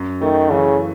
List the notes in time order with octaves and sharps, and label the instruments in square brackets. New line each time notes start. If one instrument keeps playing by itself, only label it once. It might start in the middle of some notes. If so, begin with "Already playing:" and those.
Already playing: [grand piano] F#2
[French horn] D#3 [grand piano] A3
[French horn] C#3 [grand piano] E3